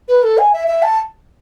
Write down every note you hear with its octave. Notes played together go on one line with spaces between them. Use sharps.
B4
A4
G#5
E5
E5
A5